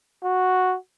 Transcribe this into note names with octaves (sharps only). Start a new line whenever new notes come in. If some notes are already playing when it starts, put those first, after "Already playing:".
F#4